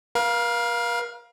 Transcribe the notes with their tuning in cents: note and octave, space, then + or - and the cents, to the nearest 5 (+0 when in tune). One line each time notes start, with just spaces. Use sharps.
A#4 +45 F5 +5